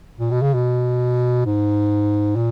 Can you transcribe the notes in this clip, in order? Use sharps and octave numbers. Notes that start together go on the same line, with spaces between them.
A#2
B2
C#3
B2
G#2
A#2